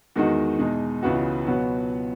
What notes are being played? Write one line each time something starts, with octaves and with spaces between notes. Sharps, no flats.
E2 D#3 G#3 D#4 F#4
E2 B2 G#3 D#4
C#2 C#3 E3 B3 F#4
B2 F#3 B3 F#4